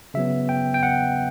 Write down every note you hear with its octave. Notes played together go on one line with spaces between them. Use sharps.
C#3 F#3 B3 E5
G5
G5
F#5